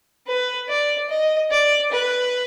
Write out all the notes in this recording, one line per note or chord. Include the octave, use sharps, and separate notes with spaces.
B4
D5
D#5
D5
B4